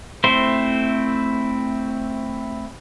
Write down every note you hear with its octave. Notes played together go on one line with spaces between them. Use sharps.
A3 C4 E4 C5